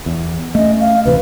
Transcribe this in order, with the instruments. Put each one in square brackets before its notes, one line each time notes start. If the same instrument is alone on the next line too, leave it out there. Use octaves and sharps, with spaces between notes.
[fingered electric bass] E2
[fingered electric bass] A3 C#4 [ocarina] D#5
[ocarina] F5
[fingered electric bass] D1 C3 E3 [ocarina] B4